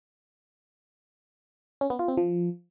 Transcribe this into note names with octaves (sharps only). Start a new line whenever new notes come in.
C#4
B3
F4
C4
F3